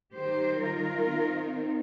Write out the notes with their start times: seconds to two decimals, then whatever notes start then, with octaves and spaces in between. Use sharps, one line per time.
0.14 D#3 G3 D#4 G4 C5
0.61 F4 A#4
1.07 D#3 C4 D#4